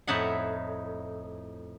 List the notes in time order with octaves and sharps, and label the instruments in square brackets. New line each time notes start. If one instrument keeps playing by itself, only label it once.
[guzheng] F2 A2 D#4 E4 E5 F#5